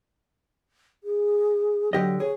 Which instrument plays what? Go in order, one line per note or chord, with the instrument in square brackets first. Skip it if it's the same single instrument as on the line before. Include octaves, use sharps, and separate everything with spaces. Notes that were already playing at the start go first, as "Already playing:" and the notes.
[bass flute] G#4
[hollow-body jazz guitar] D3 G4 D#5 [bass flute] F#3
[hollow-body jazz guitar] G#4 [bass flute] C#5